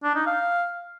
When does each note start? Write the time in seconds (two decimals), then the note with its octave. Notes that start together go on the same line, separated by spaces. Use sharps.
0.04 D4
0.15 D#4
0.26 F5